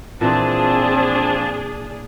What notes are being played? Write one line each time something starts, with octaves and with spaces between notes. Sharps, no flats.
A#2 E3 F3 C4 D4 G#4 A5